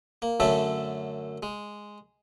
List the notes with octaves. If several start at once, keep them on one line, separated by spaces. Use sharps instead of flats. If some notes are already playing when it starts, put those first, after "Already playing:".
A#3
F#2 D3 A3 C#4 A4 E5
G#3